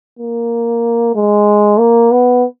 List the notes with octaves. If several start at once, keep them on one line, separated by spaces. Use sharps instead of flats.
A#3
G#3
A#3
B3